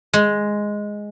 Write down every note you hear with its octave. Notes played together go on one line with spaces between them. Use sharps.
G#3